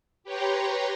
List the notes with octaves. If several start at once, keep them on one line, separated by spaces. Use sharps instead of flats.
G4 B4 C#5 G5 A#5 C6